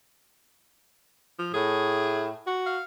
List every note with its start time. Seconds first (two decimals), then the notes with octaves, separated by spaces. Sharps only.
1.39 F3
1.54 A2 G#4
2.47 F#4
2.66 F5